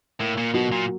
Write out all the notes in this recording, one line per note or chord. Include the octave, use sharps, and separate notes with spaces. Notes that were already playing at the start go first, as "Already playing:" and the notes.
A2 A#3
A#2
B2 F#3
A#2